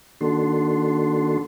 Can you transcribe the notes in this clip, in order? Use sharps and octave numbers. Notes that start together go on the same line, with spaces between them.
D#3 A#3 D4 F#4 A4 C6